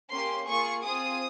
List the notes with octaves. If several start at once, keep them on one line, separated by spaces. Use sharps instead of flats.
A#3 C#4 G4 C6
A#3 F4 G#4 C#6
C4 F4 G#4 D#6